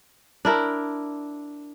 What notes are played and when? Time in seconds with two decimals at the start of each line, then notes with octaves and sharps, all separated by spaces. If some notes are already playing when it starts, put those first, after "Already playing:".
0.45 D4 E4 A#4